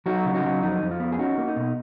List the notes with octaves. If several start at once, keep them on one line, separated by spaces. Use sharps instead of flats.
F#3 D#4 F#4
C#3
D#4 F#4
F#3
F2 D#4
F2
F4
B3
G#4
C#4 D#4 F#4
A#3
D#4
B2